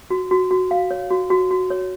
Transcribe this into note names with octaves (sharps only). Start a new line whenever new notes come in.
F#4
F#4
F#4
F5
C#5
F#4
F#4
F#4
C#5